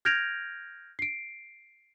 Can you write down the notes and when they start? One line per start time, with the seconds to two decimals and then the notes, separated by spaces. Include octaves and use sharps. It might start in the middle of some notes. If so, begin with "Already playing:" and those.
0.05 F6 G6 G#6 A#6 D7 F7
0.99 C7 D7